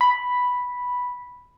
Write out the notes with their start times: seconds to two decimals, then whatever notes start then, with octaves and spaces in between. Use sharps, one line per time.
0.01 B5